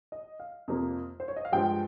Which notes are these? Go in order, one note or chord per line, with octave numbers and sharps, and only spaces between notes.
D#5
F5
F2 C3 F3 A#3
C5
C#5
D#5
F5
G2 F3 G#3 G5